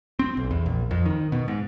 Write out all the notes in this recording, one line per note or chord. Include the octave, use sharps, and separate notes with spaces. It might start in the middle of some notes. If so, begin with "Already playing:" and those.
C4
B1
E2
A#1
F2
D#3
B2
G#2